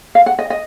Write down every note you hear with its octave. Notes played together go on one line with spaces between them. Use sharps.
F5
F#5
D#5
D#5